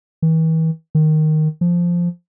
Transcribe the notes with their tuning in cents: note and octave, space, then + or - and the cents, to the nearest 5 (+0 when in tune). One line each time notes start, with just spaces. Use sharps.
E3 -40
D#3 -5
F3 -5